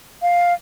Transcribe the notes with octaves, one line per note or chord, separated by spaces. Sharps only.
F5